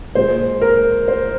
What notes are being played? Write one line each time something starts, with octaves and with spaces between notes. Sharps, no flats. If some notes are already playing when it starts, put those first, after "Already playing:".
A#2 G#3 C5
A#4
C5